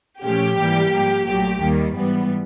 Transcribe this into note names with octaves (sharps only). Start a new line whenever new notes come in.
A#2 F3 A3 C#4 G4
G#2 E3 G3 A#3
G#2 F3 A#3
A#1 A#2 F#3 A3 G4
D#2 D#3 G3 A#3
G#2 E3 G3 B3